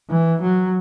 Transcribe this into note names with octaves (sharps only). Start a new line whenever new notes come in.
E3
F#3